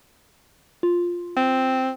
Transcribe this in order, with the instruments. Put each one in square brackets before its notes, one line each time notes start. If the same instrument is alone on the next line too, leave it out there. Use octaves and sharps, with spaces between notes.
[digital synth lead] F4
[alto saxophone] C4